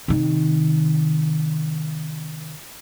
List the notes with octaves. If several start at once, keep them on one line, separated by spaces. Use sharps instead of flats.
C3 D#3